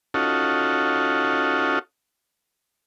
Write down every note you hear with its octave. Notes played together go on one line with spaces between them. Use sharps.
C#4 D#4 F4 F#4 A4